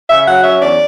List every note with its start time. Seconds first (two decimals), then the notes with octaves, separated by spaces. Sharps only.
0.09 C#3 E5
0.27 F#3 F#5
0.44 C#4 E5
0.61 E2 D5